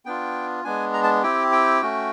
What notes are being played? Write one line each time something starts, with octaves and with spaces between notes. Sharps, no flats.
B3 D4 F4 G5
G#3 B3 D4 G#5
A#5
A5
C4 E4 G4 G5
G5
A3 C#4 F#4